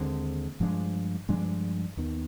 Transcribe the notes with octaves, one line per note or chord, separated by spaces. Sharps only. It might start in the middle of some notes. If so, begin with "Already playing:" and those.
Already playing: D#2 D3 G#3 C4
G2 F3 G#3 D4
G2 F3 G#3 D4
D#2 D#3 B3